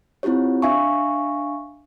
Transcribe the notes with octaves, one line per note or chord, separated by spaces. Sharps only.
C4 E4 F4 G4 C#5
D4 E5 F5 G#5 C#6